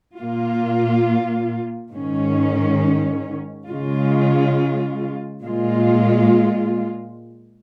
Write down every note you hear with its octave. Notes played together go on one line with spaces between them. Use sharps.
A#2 A#3 F4
G#2 D#3 C#4
C#3 G#3 F4
A#2 G#3 F4